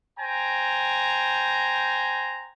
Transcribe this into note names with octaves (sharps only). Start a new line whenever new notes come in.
C5 G5 G#5 A#5